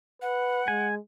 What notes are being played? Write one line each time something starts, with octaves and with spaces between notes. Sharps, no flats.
B4 F#5
G#3 G#5